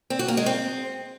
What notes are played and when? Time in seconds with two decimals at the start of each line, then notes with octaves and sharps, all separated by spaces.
0.10 C4
0.19 F#4
0.28 A#3
0.37 G#3
0.46 C4